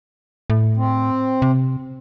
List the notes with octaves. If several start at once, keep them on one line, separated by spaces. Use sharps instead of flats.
A2
C4
C3